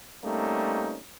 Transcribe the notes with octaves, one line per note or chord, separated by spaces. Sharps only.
G3 A3 A#3 C4 C#4 D#4